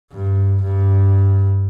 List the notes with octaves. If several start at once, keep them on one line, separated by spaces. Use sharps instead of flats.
G2
G2